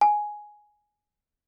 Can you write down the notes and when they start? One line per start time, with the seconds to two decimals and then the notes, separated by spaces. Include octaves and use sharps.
0.01 G#5